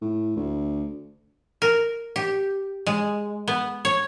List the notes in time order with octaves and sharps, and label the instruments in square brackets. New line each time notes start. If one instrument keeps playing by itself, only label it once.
[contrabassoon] A2
D2
[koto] A#4
G4
G#3
B3
C#5